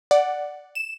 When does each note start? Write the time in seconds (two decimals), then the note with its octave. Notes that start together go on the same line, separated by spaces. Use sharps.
0.11 D5 F#5
0.75 E7